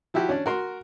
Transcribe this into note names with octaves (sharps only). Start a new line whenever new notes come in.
F3 E4 F#4 G4
C#4 D4
F#4 A#4 C6